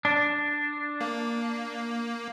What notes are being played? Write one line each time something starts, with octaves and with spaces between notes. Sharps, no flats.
D4
A#3